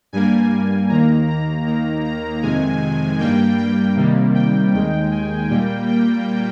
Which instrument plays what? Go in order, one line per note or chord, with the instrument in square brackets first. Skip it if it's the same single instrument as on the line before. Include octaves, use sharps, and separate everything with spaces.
[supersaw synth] G2 G3 A#3 G#5
D#2 D#3 A#3 A#5
A#5
D#2 D#3 A#3 A#5
A#5
F2 C3 D#3 G#3 G#5
G2 G3 A#3 G5
G5
C3 D#3 G3 A#3
G5
D#2 D#3 G#3 G5
G#5
A#2 G3 A#3 G5
G5